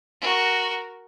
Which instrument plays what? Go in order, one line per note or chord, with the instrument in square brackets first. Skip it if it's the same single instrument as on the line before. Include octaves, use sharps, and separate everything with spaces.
[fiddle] F#4 A#4